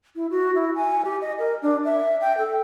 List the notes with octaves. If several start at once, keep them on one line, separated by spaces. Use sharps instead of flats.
E4
F#4
E4
G#5
G4
D#5
A#4
D4
E5
G5
A4